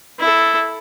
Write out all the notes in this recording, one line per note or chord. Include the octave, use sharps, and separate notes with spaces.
E4 A4